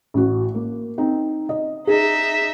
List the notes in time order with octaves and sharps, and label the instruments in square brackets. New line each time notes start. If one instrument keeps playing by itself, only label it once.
[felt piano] A1 F#4
A#3
C4 D#4
D#5
[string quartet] D#4 E5 [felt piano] G#4